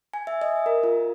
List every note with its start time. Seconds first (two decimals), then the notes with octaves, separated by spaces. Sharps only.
0.13 G#5
0.27 E5
0.42 D#5
0.66 A#4
0.83 F4